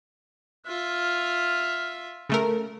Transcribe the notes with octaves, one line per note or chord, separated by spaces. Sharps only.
F4 E5 F6
C#3 A3 A#4